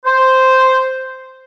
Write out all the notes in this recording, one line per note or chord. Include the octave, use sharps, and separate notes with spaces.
C5